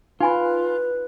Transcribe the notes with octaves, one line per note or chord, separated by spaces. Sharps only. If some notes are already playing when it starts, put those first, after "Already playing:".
D#4 F4 B4 G#5 B5